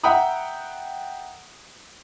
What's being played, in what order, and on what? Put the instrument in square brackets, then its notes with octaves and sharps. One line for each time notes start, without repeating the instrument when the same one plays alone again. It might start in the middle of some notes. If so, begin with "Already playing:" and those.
[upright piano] E5 F#5 G5 A#5 B5 D#6